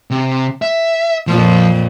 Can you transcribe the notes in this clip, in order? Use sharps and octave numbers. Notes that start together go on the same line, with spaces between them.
C3
E5
F2 A#2 F3